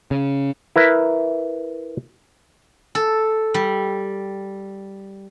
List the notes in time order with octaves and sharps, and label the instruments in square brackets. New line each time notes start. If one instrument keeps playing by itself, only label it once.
[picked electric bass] C#3
[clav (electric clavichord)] E4 A#4 B4 E5
[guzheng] A4
G3